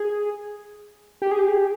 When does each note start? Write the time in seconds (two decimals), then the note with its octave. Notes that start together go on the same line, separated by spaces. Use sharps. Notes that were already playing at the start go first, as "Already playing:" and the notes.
Already playing: G#4
1.22 G4
1.31 G#4
1.39 G4
1.48 G#4
1.57 G4